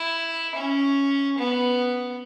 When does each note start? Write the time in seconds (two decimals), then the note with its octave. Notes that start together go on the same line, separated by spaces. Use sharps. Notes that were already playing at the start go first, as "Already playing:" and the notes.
Already playing: E4
0.55 C#4
1.38 B3